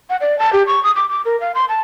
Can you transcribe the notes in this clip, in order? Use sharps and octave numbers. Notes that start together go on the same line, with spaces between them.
F#5
D5
A5
G4
C#6
D#6
D6
D6
A#4
F5
C6
A5